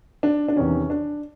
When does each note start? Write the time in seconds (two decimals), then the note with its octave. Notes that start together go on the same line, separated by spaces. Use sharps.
0.23 D4
0.48 D4
0.56 E2 C3 D#3 C#4
0.90 D4